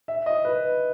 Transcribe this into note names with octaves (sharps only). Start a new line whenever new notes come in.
E5
D#5
B4